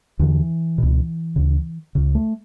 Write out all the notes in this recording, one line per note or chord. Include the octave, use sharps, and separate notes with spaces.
E2 D3 E3
C#2 B2
D2 C#3
C#2 C#3
A3